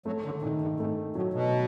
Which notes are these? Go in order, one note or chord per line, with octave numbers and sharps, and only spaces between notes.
F#3 A3
D3
A#2 D#3
G2
G#2 A3
A2 F#3
B2